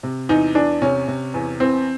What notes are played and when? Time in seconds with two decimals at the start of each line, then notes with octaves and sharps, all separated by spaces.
0.03 C3
0.29 E2 D#4
0.55 E2 D4
0.82 C3 C#4
1.08 C3
1.34 E2
1.60 E3 C4